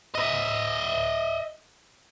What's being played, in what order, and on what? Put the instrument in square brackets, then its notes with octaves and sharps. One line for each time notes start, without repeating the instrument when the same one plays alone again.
[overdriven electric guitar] D#5 E5